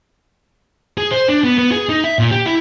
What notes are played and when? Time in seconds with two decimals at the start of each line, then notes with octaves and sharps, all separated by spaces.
0.98 G#4
1.11 C5
1.28 D4
1.44 B3
1.58 B3
1.72 G#4
1.89 D#4
2.04 E5
2.19 A#2
2.31 G4
2.46 E4